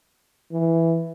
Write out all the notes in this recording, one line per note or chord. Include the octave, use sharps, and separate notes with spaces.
E3